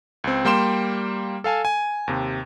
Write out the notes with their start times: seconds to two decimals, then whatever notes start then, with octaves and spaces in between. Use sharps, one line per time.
0.24 C#2 C4
0.45 G3 A#3 G5 C6 E7
1.44 A4 F5 G#5 A5
1.65 G#5
2.08 D#2 C3